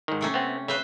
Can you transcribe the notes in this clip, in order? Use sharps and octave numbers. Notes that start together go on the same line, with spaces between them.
G#2 D#3
C3 A3 C#4
B3 C4
C#3 B4 C5 E5